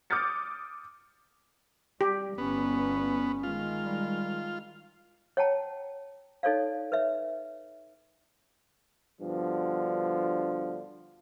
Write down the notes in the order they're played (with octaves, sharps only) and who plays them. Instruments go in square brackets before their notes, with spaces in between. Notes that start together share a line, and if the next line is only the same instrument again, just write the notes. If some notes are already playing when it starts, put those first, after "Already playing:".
[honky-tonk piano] D6 D#6 F6 G6 A6 C#7
[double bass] G3 [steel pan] G4
[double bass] G1 [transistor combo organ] B3 [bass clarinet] C#4
[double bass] D#3 G#3 [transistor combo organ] F4
[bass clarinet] G3
[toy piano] C#5 F#5 G5 A5 A#5
D#4 A4 C#5 D5 F5
B4 C#5 E5
[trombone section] G2 B2 D3 F3